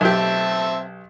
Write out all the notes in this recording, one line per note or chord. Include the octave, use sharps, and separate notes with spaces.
B1 C4 G4 E5 A5